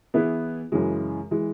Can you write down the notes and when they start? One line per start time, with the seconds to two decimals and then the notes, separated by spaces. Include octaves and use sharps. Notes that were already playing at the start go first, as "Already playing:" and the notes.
0.14 E3 B3 E4 G#4 B4
0.72 F#2 C#3 E3 G#3
1.31 E3 G#3